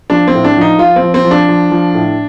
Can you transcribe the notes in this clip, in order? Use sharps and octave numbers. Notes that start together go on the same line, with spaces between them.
F3 D4
C4
A2
D4
F3 D#4
F3 F4
C4
F3
C4
F3
D4
F3
F3
A2